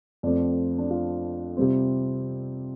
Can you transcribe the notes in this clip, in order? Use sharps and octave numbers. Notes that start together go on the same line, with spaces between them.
F2 F3 A3 C4 D5
D4
F4
C3 G3 C4